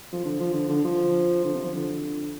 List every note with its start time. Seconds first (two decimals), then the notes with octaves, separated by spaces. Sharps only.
0.13 F3
0.25 D3
0.40 F3
0.54 D3
0.69 D3
0.84 F3
1.44 D3
1.54 C3
1.64 F3
1.74 D3